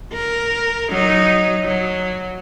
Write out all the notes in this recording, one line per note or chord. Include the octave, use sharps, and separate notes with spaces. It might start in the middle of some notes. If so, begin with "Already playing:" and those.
A#4
F#3 D#4
F#3